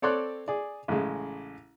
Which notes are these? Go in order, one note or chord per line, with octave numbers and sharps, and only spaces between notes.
C4 A4 C#5 D5 C6 F#6
G#4 D5
A1 C#3 G#3